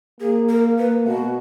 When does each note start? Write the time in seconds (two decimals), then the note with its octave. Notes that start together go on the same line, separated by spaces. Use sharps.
0.20 A#3 G#4
0.49 A#4
0.78 A#3 B4
1.07 B2 F#4